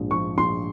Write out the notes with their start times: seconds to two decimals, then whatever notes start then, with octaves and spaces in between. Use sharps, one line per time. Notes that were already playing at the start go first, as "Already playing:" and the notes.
Already playing: A#1 G#2
0.11 F3 C#6
0.37 A#1 C6